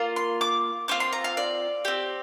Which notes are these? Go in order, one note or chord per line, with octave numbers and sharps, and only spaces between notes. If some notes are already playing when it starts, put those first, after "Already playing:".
Already playing: A#3 F4
C6
D6
C4 F4 D6
C6
A#5
F5
D5
C4 G4